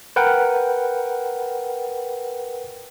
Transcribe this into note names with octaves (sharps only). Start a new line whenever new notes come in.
A#4 B4 F#5 G5